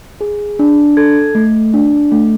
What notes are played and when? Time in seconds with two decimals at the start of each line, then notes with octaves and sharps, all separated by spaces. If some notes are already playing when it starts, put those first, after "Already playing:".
0.21 G#4
0.59 D4
0.97 A4 G#6
1.35 A3
1.74 D4
2.12 A3